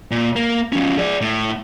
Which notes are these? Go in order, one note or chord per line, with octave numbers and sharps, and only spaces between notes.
A#2
A#3
F3 C#4
G#4 D5
A2